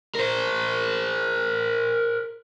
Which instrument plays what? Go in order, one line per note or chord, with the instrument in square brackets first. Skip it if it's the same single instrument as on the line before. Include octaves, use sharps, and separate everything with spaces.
[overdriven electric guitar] A#4 C5